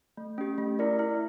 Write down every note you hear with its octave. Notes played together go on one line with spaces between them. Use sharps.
A3
C#4 G4
A3
E4 A#4 D5
E4